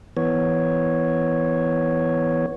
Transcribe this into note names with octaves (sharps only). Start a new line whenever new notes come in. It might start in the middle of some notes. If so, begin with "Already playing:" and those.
E3 B3 C#5